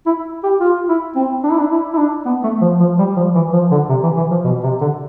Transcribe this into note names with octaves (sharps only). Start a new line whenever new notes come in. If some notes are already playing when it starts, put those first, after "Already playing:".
E4
G4
F4
E4
C4
D4
E4
D4
E4
E4
D4
B3
A3
F3
F3
G3
F3
E3
F3
D3
C3
E3
E3
F3
B2
C3
D3